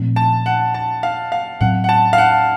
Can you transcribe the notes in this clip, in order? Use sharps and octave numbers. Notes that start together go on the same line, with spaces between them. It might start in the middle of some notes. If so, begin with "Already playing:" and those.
Already playing: A#2 F3 A3 C4
A5
F#5
A5
F5
F5
A2 F#3 C4 F#5
F#5
A5
F5
F#5